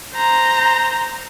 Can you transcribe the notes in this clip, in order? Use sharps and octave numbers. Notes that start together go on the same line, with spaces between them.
C5 A#5